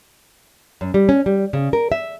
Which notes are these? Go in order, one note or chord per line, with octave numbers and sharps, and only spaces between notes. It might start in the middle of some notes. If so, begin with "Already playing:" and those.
F#2
G3
C#4
G3
C#3
A#4
E5